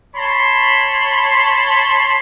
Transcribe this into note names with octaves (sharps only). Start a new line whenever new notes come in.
C#5 A5 B5 C6